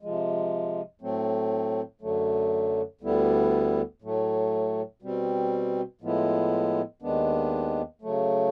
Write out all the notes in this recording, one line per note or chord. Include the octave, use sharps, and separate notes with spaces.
C3 F3 G#3
A2 F#3 A3 C4
F#2 D3 F#3 A3
D2 D3 G3 B3 E4
A2 F#3 A3
B2 G3 C4
A2 F3 G#3 B3 E4
D#2 D#3 G#3 B3 D4
C#3 F#3 A3